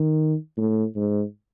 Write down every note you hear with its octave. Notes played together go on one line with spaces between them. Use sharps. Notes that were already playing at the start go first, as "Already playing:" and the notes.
Already playing: D#3
A2
G#2